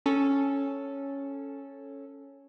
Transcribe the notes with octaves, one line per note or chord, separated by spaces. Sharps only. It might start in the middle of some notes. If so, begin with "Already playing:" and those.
C#4 A4